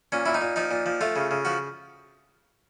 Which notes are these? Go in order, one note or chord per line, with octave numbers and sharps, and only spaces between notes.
A#2 C#4
A#2 E4
D#4
A#2
F3 D#4
A#2
F3
A3 F4
C#3
C#3
F3 F#4